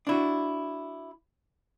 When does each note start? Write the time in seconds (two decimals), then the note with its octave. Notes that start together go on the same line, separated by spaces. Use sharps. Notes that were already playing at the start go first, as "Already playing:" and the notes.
0.07 D4 E4 F#4